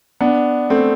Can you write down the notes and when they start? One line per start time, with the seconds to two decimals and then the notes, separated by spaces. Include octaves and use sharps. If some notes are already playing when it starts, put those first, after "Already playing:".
0.21 B3 D4
0.70 A3 C4